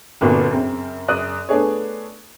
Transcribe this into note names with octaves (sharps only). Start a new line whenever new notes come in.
G1 C2 A#2 B3 F#4
F#2 C#3 C4
F#2 C#3 D5 D#6 F#6 D#7
A3 B3 D4 G#4 C#5